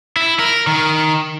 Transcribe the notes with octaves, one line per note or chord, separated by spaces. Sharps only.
E4
A#4
D#3